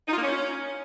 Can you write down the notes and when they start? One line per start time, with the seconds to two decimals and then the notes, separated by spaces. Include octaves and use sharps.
0.08 D#4
0.13 F4
0.18 A#3
0.23 C#4